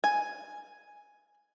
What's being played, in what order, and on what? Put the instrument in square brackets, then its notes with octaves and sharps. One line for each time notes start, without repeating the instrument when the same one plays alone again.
[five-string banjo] G#5